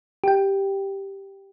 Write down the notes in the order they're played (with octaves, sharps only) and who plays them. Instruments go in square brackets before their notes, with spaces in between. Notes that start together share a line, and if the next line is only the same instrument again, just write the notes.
[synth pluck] G4 G5